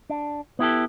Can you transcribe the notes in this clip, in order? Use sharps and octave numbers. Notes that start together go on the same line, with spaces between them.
D4
B3 E4 G4 A4